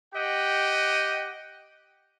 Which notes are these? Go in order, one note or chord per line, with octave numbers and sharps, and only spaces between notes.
G4 D#5 F#5 G5